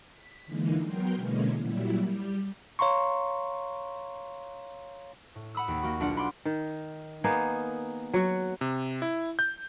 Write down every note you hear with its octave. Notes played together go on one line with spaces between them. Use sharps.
B6
D3 E3 G#3 A#3 D#4
F#3 B3 A#4 G5 C6 G6
B2 D3 E3 G#3 A#3 C#4
A#2 F#3 G3 E4
G3 G4
C#5 F5 A#5 C6 C#6
A2
F#5 B5 D#6 E6
D#2
A#3 F#4
B1 D4 F4 F#5
B5 C6 D6
D#3
A#3 B3 D#4 G#4
F#3 F#4
C3
E4
G6